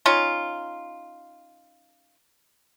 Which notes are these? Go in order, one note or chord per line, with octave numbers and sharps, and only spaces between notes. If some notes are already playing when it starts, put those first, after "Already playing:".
C#4 D#4 F4